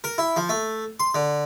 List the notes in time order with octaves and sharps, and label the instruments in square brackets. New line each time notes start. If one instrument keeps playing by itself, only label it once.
[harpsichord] A#4
E4
F3
A3
C6
D3